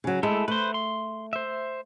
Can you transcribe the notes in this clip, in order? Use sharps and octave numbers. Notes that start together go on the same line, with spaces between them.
C#3 F#3
G#3 A3 E4 A4
A3 B4 C5
C6
C5 E5